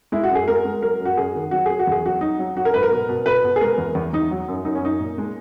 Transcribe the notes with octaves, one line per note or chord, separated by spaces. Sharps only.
G#3 E4
F#4
F#2
G#4
G#3 A#4
G#3
F#3 A#4
F#2
F#4
F#2 G#4
D#3
F#3 F#4
F#3 G#4
F#4
E2 G#4
F#3 F#4
F#3 D#4
F#3
F#3 F#4
A#4
G#2 B4
A#4
B2
B2
B2 B4
B2
G#4
G#3 A#4
E2
E2
E2 D#4
F#3
F#2
F#2 D#4
C#4
F#2 D#4
A#2
G#3